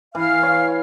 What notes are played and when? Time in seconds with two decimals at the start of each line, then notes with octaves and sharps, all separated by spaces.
0.15 E3 F5 F6
0.43 C#5